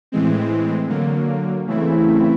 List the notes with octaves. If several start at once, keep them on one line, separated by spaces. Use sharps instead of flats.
A2 E3 G#3 C4
D3 F#3 A#3
C#3 E3 A3 C4 E4